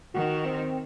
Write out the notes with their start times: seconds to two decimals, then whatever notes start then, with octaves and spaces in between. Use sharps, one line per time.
0.14 D#3 F#4
0.45 C4